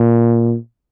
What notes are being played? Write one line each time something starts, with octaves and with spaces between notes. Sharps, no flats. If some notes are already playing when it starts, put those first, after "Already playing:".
Already playing: A#2